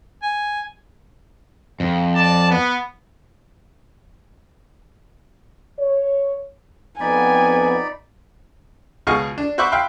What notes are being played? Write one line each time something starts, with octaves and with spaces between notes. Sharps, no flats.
G#5
F2
D5 A5
B3
C#5
F2 B3 D#4 D5 G#5 B5
C#2 B2 G#4 D#5 F5 C#6
D4
F#4 C5 E5 B5 C#6 D6
E5 F5 G5 B5 C6 F#6